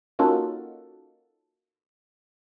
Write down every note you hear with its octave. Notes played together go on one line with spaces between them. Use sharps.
A#3 C#4 D#4 F4 F#4 A4